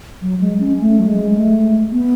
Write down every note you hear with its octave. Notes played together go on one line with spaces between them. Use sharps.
F#3
G#3
C#4
A3
F#3
G#3
A3
B3